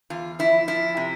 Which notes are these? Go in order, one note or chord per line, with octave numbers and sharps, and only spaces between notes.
E2 F4
F3 E4
F3 E4
C3